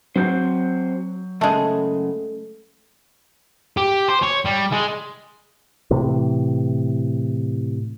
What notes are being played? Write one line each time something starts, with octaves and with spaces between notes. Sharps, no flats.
F#3 C4 F#4 C5 G6
F#2 C#3 G#3 A3
G4
C5
C#5
G3
G#3
A2 C3 E3